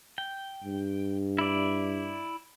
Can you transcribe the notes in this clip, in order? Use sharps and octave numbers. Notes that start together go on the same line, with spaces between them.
G5
G2
E4 D5